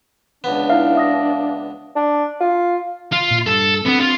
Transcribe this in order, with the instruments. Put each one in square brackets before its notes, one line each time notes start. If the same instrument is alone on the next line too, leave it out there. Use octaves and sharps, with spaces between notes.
[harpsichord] C#2 B3 [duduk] D4
[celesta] D#4 E4 E5 [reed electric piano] F5
[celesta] E5 D#6 A#6
[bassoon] D4
F4
[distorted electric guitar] F4
[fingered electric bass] A#2
[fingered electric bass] G2 [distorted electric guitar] A4
[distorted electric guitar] B3 [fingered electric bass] C4 D4
[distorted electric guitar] F4